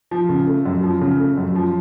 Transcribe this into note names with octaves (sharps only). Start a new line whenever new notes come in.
F3
C#3
A3
F#2
F3
C#3
A3
F#2
F3